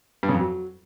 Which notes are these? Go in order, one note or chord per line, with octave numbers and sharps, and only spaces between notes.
G2
C#3
F2
F#3